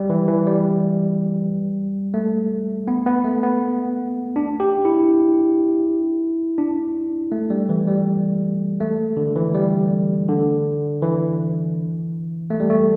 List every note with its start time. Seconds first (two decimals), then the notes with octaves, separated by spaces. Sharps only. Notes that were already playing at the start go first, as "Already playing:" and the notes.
Already playing: G3
0.10 E3
0.28 E3
0.47 G3
2.14 A3
2.88 B3
3.06 B3
3.25 A3
3.43 B3
4.36 D4
4.60 G4
4.85 E4
6.58 D4
7.32 A3
7.50 G3
7.69 E3
7.88 G3
8.80 A3
9.17 D3
9.36 E3
9.54 G3
10.28 D3
11.02 E3
12.50 A3
12.60 G3
12.70 A3